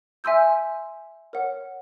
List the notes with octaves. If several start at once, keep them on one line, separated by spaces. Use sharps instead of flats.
E5 G#5 C6 E6 G6
A#4 C#5 F#5